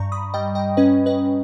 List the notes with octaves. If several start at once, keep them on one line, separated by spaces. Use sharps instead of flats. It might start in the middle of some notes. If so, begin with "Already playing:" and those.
Already playing: G2 A#5 C#6
B5 D#6
G3 D#5 G5
D#5 G5
C#4 B4 D#5
B4 D#5